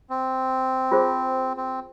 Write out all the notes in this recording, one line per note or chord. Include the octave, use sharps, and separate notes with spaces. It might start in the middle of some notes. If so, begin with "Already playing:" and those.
C4
F4 G#4 C5
C4